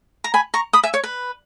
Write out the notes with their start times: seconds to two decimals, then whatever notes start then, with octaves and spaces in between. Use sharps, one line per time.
0.24 A#5
0.34 G#5 B5
0.54 A#5 C#6
0.73 B5 D#6
0.84 E5 G#5
0.94 C#5
1.04 B4